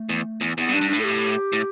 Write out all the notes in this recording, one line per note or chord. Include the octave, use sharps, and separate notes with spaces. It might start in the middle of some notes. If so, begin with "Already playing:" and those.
Already playing: A3
E2
E2
E2 B3
G2
D4
G2
A2 D4
A4
G4
A2